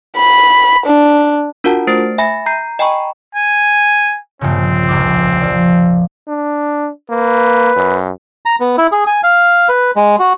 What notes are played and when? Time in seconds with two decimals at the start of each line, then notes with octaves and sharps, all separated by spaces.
0.17 B5
0.86 D4
1.64 D4 F4 F#4 A#4 F#5 A5
1.87 A3 C5 A6 C7 D7
2.18 E5 G#5 B5 A#6
2.46 A#5 G6 C7
2.79 D#5 G5 G#5 A#5 B5 C#6
3.35 G#5
4.41 A#1 G2 C#3 C4
4.88 F1 C#2 D6
5.40 F3 D5
6.28 D4
7.10 A#3 B4
7.76 F#2
8.46 A#5
8.60 B3
8.78 E4
8.92 G#4
9.07 G#5
9.23 F5
9.69 B4
9.96 G#3
10.19 F#4